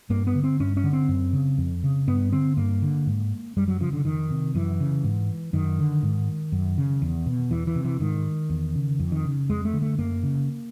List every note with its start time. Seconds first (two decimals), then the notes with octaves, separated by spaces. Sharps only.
0.10 G2 A#3
0.27 B3
0.35 D3
0.43 C4
0.60 G2 C#4
0.77 C#4
0.84 D3
0.93 C4
1.08 F#2
1.33 C#3
1.58 F2
1.84 C#3
2.07 G2 B3
2.32 D3 C4
2.57 G2 A#3
2.82 D3
3.07 G#2
3.57 F#2 G3
3.68 F#3
3.80 C#3 F3
3.93 D3
4.05 F2 D#3
4.31 C3
4.54 F#2 E3
4.80 C#3
5.04 G#2
5.53 F#2 D#3
5.79 D3
6.03 G#2
6.52 F#2
6.78 C#3
7.02 E2
7.26 B2
7.51 E2 E3
7.67 E3
7.75 C3
7.84 E3
8.00 G#2 D#3
8.50 E2
8.75 C#3
8.99 F2
9.12 D#3
9.24 C#3
9.50 F2 G#3
9.65 A3
9.73 D3
9.82 A3
9.98 F#2 A#3
10.23 C#3